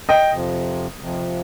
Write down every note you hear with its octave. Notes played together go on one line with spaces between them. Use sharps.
D#5 G5
F2 C3 F3
F2 C3 F3